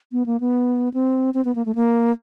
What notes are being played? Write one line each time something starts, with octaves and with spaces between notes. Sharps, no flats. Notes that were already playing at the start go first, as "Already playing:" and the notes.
B3
A#3
B3
C4
C4
B3
A#3
A3
A#3